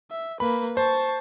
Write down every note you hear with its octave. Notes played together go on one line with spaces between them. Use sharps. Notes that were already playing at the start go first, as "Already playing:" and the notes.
E5
A#3 B4 B5
C5 A5 C#6